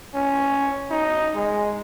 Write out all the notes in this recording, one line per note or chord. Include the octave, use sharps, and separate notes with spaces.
C#4
D#4
G#3